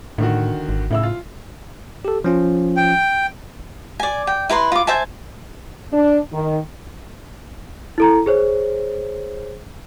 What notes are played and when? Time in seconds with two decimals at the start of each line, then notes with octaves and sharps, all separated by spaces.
0.18 A2 D3 D#3 F#4
0.69 G#1
0.91 A2 C#3 E4 E6
1.03 F4
2.05 G4 A4
2.24 F3 C#4 F4
2.77 G5
3.99 D5 G#5
4.27 G5
4.49 E4 B4 A#5 C6
4.72 F4 D6
4.87 C5 E5 G#5 A5
5.92 D4
6.33 D#3
7.98 E4 A4 A#5
8.26 G#4 C5 C#5